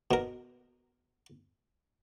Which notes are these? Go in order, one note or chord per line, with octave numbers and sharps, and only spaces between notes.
B2 A#4